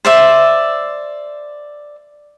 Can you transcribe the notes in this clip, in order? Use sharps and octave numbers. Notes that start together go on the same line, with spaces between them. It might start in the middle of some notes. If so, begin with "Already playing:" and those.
C5 D5 E5